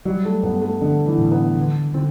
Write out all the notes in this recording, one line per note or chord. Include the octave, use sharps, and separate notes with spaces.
F#3 G3
A3
G2 B3
A3
D3 B3
E3
A2
B3
D3
D3 C4